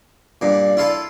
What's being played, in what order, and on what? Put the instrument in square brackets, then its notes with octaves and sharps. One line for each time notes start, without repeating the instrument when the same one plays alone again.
[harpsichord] G2 A#2 [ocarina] D5
[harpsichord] E4 F4 A4